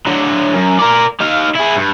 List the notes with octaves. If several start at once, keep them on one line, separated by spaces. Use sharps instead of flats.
D3 F#3
F#2
A#4 D5
D#4 F5
E4 G#4
G2